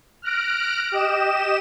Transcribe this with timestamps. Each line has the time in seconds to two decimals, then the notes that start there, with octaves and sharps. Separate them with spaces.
0.22 F6 F#6 A#6 D7
0.92 G4 D#5 E7